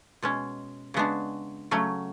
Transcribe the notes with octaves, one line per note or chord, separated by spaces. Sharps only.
B2 G#3 C#4
C#3 G#3 B3 D4 F#4
C#3 F#3 A3 C#4